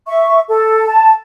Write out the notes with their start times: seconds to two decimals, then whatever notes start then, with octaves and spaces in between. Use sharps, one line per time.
0.06 E5 C#6
0.48 A4
0.87 A5